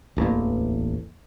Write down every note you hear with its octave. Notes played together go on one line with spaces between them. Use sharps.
D1 A1 E2 A#3